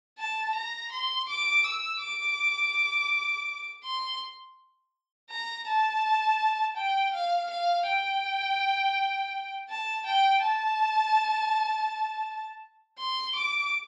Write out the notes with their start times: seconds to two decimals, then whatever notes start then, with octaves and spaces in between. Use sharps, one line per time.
0.18 A5
0.55 A#5
0.92 C6
1.28 D6
1.64 E6
2.01 D6
3.84 C6
5.30 A#5
5.67 A5
6.76 G5
7.13 F5
7.50 F5
7.86 G5
9.69 A5
10.06 G5
10.42 A5
12.98 C6
13.35 D6